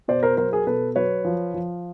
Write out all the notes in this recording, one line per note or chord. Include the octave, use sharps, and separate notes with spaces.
B2 C5 D5
A#4 C5
F#3 A#4 C5
G#4 A#4
B2 A4 B4
F#3 B4 C#5
F3
F3